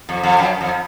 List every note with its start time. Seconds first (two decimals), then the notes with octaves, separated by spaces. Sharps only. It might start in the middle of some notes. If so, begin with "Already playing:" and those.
0.09 F2
0.23 F2
0.38 F#2
0.61 F2